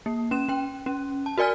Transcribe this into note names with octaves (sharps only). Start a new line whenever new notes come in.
A#3
C#4 E7
C#4 G5
C#4
A5
F#4 A#4 D5 G#5 F6